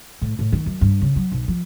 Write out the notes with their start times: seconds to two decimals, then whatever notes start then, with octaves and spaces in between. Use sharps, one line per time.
0.22 A2
0.39 A2
0.53 D#3
0.66 F#2
0.81 G2
1.01 C#3
1.16 F#3
1.32 B1
1.48 F3